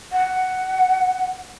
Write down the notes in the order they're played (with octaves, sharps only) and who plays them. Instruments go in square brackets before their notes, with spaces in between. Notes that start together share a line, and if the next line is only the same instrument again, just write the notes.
[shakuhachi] F#5